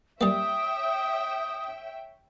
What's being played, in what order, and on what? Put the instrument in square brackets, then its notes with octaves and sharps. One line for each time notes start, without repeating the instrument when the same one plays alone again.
[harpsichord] G3 A#3 [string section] C#5 E5 G5 [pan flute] D#6